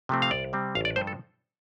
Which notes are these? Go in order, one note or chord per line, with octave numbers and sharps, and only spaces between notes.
C3 F3 A3 C4
F5
C2 D5
C3 G3 C4
A1 F5
D5
G2 F3 C5
A4